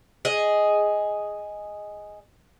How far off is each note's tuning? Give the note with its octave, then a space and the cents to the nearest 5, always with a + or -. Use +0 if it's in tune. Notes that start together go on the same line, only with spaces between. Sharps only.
G#4 +0 D#5 +0